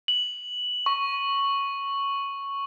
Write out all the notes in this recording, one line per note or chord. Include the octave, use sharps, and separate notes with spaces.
F#7
C#6